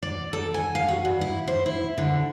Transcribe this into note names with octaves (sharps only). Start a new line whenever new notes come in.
D5
A4
G#5
F5
F#4
G2
E4
C5
E4
D3